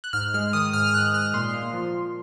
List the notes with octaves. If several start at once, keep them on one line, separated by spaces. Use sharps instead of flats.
F#6
G#2 F6
G#3 F6
D#3 D#6
G#2 F6
F6
G#2 F#6
G#3 F6
A#2 C6
A#3
F3
A#2